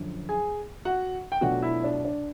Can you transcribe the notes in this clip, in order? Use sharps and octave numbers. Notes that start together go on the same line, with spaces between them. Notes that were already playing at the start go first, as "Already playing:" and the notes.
Already playing: F#2 D3 F3
G#4 G#5
F#4 F#5
G5
B2 F#3 A3 D4 F4 F#4 F#5
E4 E5
D4 D5
D4 D5